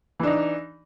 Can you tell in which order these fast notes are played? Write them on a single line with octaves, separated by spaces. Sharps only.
E3 D4 D#4